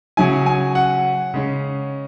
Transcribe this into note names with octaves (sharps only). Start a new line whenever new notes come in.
C#3 F#3 C#4 E4 G#5
G#5
F#5
C#3 G#3 C#4